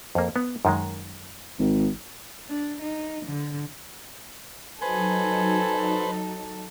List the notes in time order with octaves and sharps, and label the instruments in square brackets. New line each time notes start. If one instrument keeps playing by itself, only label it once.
[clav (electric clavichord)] F2 A#3
B3
F#2 D#3 G#3
[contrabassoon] G#1
[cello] D4
D#4
D3
[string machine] F#3 D#4 [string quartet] A4 [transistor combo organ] B4 C5 [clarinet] G#5